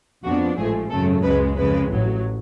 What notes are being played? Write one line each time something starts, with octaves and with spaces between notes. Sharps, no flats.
F2 F3 B3 D4 F#4
A1 G#2 F3 A3 G#4
G#1 F#2 C#3 F#3 A3 A4
C#2 C#3 G#3 B4
F2 C#3 G#3 B4
A1 A2 F#3